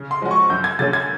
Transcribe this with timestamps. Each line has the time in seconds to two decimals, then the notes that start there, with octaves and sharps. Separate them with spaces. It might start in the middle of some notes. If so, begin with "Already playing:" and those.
Already playing: C#3
0.11 C6
0.21 F3 G#3 C#4 F#4
0.31 C#6
0.50 F#2 G6
0.64 G#6
0.79 D3 F#3 A#3 C#4 A6
0.93 G#6